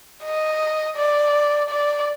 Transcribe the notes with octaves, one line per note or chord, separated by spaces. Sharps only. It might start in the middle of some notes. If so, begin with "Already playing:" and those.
D#5
D5
D5